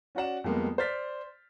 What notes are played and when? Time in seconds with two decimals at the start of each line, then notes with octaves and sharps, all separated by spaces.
0.15 C#4 F#4 D5 F#5 E7
0.44 F2 G3 G#3 A#3 B3
0.78 C5 D5 F6 A6 B6